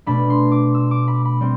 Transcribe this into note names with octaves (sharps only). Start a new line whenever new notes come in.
B2 A3 D4 B5
C6
D6
E6
D6
B5
B5
G3 C4